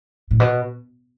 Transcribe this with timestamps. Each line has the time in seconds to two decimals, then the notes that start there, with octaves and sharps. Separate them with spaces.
0.31 A2
0.40 B2